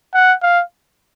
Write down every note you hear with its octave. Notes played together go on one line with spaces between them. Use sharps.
F#5
F5